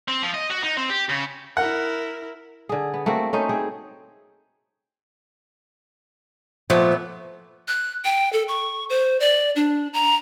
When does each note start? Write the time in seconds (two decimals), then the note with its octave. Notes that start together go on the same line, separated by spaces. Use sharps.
0.08 C4
0.22 F3
0.34 D#5
0.50 F#4
0.63 D#4
0.77 C4
0.90 G4
1.09 C#3
1.57 E4 A#4 F#5
2.69 D3 G#4
2.94 B3
3.06 A3 A#3 C4 F#4
3.33 A3 C#4 D#4 C5
3.49 C4 G#4
6.70 A#2 F3 A3 B3
7.68 F#6
8.05 G5
8.33 A4
8.48 C#6
8.90 C5
9.20 D5
9.56 D4
9.93 A#5